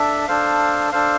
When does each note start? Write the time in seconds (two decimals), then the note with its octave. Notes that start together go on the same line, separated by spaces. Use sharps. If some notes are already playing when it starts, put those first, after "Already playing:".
Already playing: D4 A4 E5
0.28 D4 A4 C5 F5
0.92 D4 A4 C5 F5